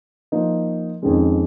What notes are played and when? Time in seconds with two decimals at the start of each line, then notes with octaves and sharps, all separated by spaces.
0.32 F3 A#3 D#4
1.02 F2 D#3 G#3 C#4